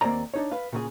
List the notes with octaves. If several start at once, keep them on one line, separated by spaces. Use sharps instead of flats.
D#2 A#3 C4 D5 A#5
D4 D#4 C#5
B4 F5
A#2 C#3 G#4